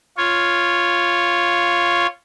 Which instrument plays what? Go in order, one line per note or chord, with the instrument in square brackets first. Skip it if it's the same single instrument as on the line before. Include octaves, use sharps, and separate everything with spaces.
[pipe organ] F4 C#5